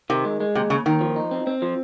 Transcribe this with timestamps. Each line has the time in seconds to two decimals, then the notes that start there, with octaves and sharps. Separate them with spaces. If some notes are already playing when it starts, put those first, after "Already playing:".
0.10 C3 D#3
0.25 G#3
0.40 G#3
0.55 D#2 C3
0.70 D#2 C#3
0.86 D#2 D#3
1.01 F3
1.16 D#4
1.31 C4
1.47 C4
1.62 F3